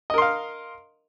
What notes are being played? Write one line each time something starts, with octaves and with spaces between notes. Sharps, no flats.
A#4 D#5 F5 C6